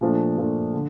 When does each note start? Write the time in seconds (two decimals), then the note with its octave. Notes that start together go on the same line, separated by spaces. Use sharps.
0.01 A#2 F3 A3 D4
0.37 A#2 F3 A3 D4
0.74 D3